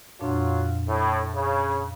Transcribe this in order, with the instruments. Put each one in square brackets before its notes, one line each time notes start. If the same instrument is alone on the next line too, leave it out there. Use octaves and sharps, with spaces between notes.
[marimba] F2 A#2 D4 [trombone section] F#3 F4
[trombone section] A2
C#3